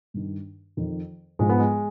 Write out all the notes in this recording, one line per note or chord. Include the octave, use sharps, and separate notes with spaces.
G2 D#3
F2 D#3
G#2 F3 G#3
B3
G#3